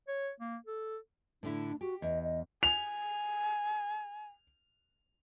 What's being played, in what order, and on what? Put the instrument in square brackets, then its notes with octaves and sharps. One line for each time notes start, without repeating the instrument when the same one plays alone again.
[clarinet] C#5
A#3
A4
[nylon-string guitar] A2 D3 E4 [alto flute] D4
[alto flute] F#4 [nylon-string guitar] G4
[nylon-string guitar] E2 [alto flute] D#5
[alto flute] D#5
[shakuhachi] G#5 [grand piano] F7